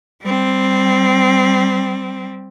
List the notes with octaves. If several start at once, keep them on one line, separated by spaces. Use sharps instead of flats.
G3 C4